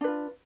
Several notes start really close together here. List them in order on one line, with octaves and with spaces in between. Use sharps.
D4 B4 F4